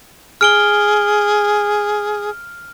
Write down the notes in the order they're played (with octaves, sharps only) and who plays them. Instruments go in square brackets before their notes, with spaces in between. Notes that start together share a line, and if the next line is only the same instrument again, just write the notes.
[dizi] G#4 [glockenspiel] F6 D7 G7